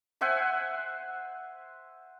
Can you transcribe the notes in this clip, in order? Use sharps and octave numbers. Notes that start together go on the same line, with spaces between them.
C5 E5 F#5 G#5